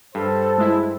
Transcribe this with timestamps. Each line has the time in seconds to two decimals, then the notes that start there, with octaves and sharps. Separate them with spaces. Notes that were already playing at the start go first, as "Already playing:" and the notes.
0.15 G2 A4 C5
0.58 G#3 E4